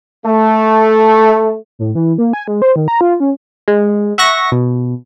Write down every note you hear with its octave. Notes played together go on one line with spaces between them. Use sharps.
A3
A2
E3
A#3
G#5
G#3
C5
D#3
A#5
F4
C#4
G#3
E5 F#5 C#6 A#6
B2